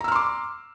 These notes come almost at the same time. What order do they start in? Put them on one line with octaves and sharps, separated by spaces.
A#5 E6 F6 C6 D6